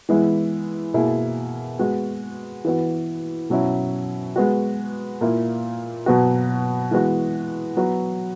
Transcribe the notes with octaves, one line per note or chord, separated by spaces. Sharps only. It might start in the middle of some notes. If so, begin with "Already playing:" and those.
E3 G#3 B3 E4
B2 A#3 E4 G#4
G#3 B3 F#4
E3 B3 F#4
B2 F#3 C#4 E4
G#3 B3 F#4
A#2 A#3 E4
B2 F#3 B3 F#4
E3 G#3 B3 F#4
F#3 B3 F#4